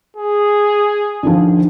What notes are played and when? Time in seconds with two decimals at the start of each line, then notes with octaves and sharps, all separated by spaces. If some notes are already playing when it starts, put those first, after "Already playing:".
0.17 G#4
1.23 D3 D#3 F3